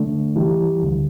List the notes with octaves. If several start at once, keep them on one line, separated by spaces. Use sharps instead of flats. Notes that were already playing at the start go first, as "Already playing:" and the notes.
Already playing: D3 A3 D4
E3 G3 E4 G4
D2 D3 G3